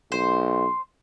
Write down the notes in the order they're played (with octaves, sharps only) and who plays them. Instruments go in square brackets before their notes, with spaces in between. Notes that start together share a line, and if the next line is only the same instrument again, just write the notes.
[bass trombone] B1 [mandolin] C5